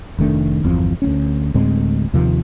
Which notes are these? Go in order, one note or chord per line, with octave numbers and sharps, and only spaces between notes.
F1 D#3 A3 D4
G1 E2 F3 C4
D2 B3 C#4
D2 A2 G#3 C4
D#2 C3 D#3 F3